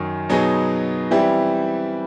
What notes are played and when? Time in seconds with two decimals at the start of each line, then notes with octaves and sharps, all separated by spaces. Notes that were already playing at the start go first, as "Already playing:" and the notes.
Already playing: F#2 D#3 F#3
0.29 B2 F#3 B3 D#4 G#4
1.11 E3 G3 C4 E4 G4